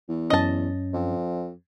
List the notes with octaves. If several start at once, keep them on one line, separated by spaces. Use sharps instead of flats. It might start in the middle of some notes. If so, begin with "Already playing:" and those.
E2
F#2 C#4 D#5 A5
F2